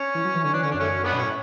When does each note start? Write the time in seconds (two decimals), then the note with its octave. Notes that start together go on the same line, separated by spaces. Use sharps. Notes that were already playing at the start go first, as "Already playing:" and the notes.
Already playing: C#4
0.15 E3
0.25 F#3
0.35 E3
0.44 D3 C#4
0.53 E3 D4
0.62 D3 C#4
0.71 F#2 D4
0.80 A3 C#4
1.03 B3 D4
1.12 B2
1.18 A2 C#4